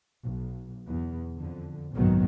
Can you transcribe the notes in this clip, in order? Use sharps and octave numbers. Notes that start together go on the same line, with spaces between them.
B1
E2
F2 D3
F#1 B1 G#2 D#3 F#3 B3